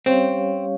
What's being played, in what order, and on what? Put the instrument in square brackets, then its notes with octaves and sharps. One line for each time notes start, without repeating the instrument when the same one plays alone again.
[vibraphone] G3 C#4 G4 C#5 F5 [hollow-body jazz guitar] C4